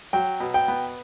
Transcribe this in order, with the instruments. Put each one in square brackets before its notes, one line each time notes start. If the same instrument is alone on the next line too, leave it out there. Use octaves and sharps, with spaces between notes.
[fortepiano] F#3 G5
B2
G5
B3